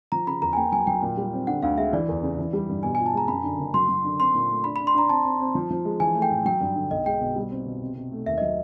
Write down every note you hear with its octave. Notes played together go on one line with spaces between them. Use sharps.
F3 A#5
C#3 B5
E2 A#5
G#5
A#3 G5
F#3 G#5
F#3 G5
A#2
G3
C4
D3 F#5
D2 F5
G#3 E5
E3 D5
E2
C#3
E3
G3
G2
B2 G#5
G#5
F4
A5
G#3 A#5
F#2 B5
D3
F#1
F#3 C6
F#3
D3
C4 C6
A#2
A3
D4 B5
B5
D4
C6
D4 A#5
C4 A5
C4
C4
F3
F3
G#3
E3 G#5
A3
G5
A2
F#3 G5
G2
D3
B1 D#5
G#3 G5
B2
G3
C4
B2
C3
C3
A3
D#2 E5
D#5
F#3